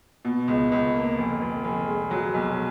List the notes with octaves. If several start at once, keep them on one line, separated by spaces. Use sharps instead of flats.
B2
C#2
C#2
A#3
F1
F1
F1
G#3
F#3
B1